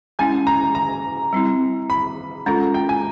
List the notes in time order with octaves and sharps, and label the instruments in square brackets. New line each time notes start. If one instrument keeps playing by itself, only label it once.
[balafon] G#3 C#4 E4 [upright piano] G#5
[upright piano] A#5
A#5
[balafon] G3 C4 E4
[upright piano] B5
[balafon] G#3 C#4 F4 A4 [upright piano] A#5
[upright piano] G5
G#5